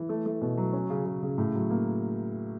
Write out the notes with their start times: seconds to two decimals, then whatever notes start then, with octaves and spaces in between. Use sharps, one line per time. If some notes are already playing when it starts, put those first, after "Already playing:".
Already playing: E3
0.09 A3
0.26 A3
0.42 B2
0.58 F#3
0.73 C#4
0.90 C#3
1.06 C#3
1.23 C#3
1.38 A2
1.55 F#3
1.70 A#3